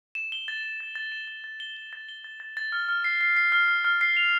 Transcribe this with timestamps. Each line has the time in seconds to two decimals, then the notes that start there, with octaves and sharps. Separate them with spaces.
0.15 E7
0.32 G7
0.48 A6
0.63 A6
0.80 A6
0.95 A6
1.12 E7
1.27 A6
1.44 A6
1.60 G7
1.77 G7
1.93 A6
2.09 G7
2.24 A6
2.40 A6
2.57 A6
2.72 F6
2.89 F6
3.04 C7
3.21 C7
3.36 C7
3.52 F6
3.68 F6
3.85 F6
4.01 C7
4.17 F7